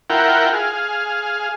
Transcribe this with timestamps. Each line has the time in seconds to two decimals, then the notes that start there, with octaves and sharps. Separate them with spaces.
0.10 E4 F4 A#4 F#5 G5
0.53 G#4 F5